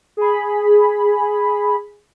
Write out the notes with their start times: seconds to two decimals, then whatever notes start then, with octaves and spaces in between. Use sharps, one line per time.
0.17 G#4 B5